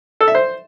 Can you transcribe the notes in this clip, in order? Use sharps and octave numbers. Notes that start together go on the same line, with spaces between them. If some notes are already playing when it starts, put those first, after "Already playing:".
A4
E5
C5